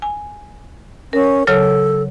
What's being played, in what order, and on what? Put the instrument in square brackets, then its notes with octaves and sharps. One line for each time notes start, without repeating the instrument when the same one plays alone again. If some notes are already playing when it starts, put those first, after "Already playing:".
[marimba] G#5
[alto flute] C#4 [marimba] A#4
[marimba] C#3 F#3 C#5 [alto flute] A4